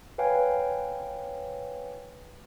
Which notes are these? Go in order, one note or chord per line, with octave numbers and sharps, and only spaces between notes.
B4 C#5 F5 G5 G#5